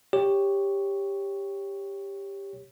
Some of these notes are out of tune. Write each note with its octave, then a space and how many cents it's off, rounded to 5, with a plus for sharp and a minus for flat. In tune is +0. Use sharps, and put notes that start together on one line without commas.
G4 +10 C#5 +0